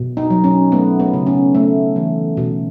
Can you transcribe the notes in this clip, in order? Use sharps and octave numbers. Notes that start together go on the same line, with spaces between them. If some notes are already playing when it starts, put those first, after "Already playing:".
Already playing: B2
D#4
F#3
C#4
A3 B3
B3
C#3
C#4
A3
E3
B2